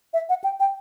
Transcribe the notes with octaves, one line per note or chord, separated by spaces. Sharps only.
E5
F#5
G5
G5